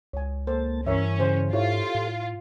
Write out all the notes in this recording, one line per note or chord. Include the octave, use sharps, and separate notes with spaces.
C#2 C#5 G#5
A#3 A4 C5 A5
G2 E3 C#4 A#4 C#5 E5
C#3 C5
G#2 E4 F4 G4 A4 C#5
A2